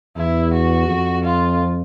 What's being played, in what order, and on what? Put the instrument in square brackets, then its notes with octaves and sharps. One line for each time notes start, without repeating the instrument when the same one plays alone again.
[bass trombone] E2 [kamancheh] E4
[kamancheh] F#4
[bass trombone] F2
[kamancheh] F4